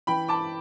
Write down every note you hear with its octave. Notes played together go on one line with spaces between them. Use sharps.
E3 G5 B5
A5 D6